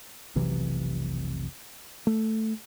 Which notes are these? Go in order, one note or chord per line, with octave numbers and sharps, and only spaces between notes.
F1 B1 C3 E3
A3